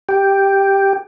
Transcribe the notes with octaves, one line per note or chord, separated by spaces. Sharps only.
G4